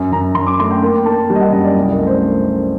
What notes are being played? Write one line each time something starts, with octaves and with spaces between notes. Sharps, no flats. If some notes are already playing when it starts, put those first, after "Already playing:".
Already playing: F#2
F#2 A#5
F#2 C6
D6
A3 C6
G5
A#3 G5
A#3 A5
G3 G5
D#5
F#5
F#2 D#5
D5
C2
A#4
A3
C5